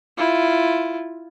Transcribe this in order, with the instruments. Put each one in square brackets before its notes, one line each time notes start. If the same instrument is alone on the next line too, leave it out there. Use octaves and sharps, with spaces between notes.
[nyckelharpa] E4 F4